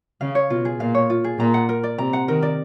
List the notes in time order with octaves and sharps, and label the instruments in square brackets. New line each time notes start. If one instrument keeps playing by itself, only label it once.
[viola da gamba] C#3 [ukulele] F5
[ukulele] C#5
[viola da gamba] B2 [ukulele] F4
[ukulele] G#4
[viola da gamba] A#2 [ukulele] F5
[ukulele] C#5
F4
G#4
[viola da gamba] A#2 [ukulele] A#5
[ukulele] F#5
A#4
D5
[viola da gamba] C3 [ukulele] A#5
[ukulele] F#5
[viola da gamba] D#3 [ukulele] A#4
[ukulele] D5